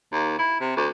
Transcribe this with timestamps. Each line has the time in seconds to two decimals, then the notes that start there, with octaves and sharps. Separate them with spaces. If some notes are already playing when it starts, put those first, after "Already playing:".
0.12 D#2
0.39 E4
0.60 C3
0.77 D2